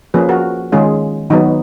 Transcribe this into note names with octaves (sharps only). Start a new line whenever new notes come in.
F3 A#3 C#4 G#4 B4
F#4 A#4
D#3 G#3 C#4 F4 G#4
D#3 F#3 B3 D#4